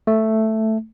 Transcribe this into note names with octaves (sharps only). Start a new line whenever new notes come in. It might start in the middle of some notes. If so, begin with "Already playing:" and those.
A3